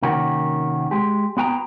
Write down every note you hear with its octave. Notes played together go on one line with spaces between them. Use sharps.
C3 D#3 A#3 C#4 F#4
G#3 G4
B3 F#4 G5 G#5 A#5